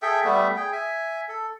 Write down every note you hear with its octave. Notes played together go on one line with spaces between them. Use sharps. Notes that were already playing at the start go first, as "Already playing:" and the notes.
G#4 A4 E5 G5
G3 A3 B3 E5
G#4 G5
E5 G#5
A4